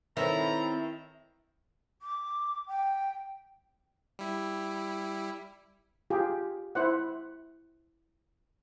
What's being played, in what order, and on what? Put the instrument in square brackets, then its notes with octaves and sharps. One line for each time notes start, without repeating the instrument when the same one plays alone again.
[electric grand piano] D#3 A4 [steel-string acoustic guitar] C4 B4 C#5 [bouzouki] E4 [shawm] A#5
[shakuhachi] D6
G5
[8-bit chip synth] G3 E4
[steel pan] F4 G4 G#4
E4 C5 F#5